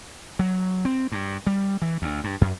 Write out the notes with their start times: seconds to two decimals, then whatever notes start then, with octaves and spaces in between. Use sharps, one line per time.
0.39 F#3
0.85 C4
1.12 G2
1.47 G3
1.82 E3
2.02 D2
2.24 G2
2.41 F#2